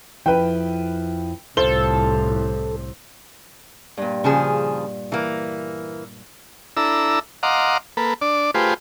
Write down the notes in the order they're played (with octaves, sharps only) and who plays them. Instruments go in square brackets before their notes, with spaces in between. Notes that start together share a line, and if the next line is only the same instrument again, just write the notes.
[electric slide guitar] F2 F3 E4 [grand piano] B4 G5
[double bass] C2 A2 [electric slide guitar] F4 [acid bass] A4 [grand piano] C5 G7
[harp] G2 A#2
[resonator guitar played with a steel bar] C#3 F3 G#4
[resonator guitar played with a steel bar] E3 A#3 [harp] A#4
[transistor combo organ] D4 E4 A4 A#5 E6
D#5 F5 F#5 A#5 C6 D6
A#3 A4 B4
D4 D5
A3 F4 G4 G#4 B4 C5